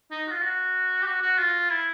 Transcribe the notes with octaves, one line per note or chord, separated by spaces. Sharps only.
D#4
F#4
F4
F#4
G4
F#4
F#4
F4
E4